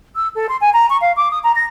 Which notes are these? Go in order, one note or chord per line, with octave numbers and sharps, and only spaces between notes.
E6
A4
C6
G#5
A#5
C#6
F5
D6
D#6
A#5
A#6